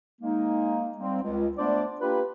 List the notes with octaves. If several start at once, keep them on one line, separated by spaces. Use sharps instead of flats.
G#3 A#3 D#4
G3 A#3 C4
C#2
A3 B3 D4 C5 D5
A#3 D4 F4 G4 B4